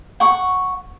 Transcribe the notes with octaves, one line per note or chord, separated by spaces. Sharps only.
F#5 C#6